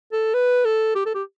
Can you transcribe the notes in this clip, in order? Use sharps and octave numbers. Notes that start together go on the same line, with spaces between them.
A4
B4
A4
G4
A4
G4